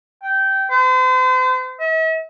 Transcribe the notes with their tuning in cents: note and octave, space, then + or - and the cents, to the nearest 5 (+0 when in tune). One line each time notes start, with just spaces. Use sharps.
G5 -20
C5 -40
E5 -45